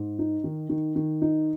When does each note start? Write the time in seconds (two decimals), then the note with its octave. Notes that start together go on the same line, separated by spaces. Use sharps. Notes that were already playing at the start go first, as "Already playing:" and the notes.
Already playing: G#2
0.19 D#4
0.44 D#3
0.69 D#3
0.96 D#3
1.22 D#4